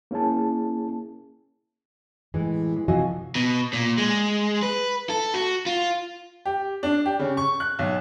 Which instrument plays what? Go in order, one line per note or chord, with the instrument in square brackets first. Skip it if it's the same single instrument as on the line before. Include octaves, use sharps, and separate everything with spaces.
[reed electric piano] A#3 C#4 E4 G#4 A5
[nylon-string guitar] A2 E3 G#3
G#3
C3 E3 F3 F#4 D#5 G#5
[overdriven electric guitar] B2
A#2
G#3
B4
A4
F#4
F4
[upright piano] G4
D4
G4
C#3
C#6
F#6
B1